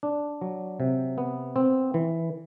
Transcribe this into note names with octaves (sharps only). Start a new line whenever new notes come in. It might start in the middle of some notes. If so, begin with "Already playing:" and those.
D4
F#3
C3
B3
C4
E3